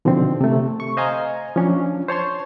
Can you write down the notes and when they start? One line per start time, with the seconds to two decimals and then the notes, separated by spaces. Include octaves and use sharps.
0.05 B2 D3 D#3 F3 C4
0.41 C3 A3
0.80 C#6
0.97 C5 D#5 F5 G#5 A#5
1.56 F3 C#4 D4
2.09 C5 C#5 A5 C6